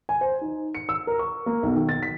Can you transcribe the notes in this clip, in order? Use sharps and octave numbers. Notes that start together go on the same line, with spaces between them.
G#5
C5
D#4
C#7
E6
A#4
C#6
A#3
B1
D#3
A6
B6